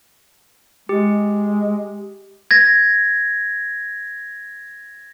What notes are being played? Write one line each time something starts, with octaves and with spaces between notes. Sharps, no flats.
G#3 G4
G#6 A#6